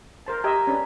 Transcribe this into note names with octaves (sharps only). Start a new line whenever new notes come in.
A#4 C5 A5
G4 D#5 E5 A#5 G#6
C#4 D4 B4